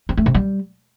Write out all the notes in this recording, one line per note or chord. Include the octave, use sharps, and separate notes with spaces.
C4
A3
C3
G3